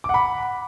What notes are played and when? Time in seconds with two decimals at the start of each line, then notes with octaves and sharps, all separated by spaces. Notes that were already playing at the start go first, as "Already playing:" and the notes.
0.04 D6
0.09 F#5
0.14 B5